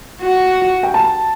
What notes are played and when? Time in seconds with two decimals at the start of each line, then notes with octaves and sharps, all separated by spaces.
0.22 F#4
0.83 G5
0.94 A5